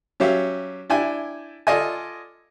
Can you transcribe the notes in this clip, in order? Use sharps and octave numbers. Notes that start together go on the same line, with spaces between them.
F#3 C#4 G4 E5 F5
D4 E4 G5 G#5
F4 A4 D5 D#5 G#5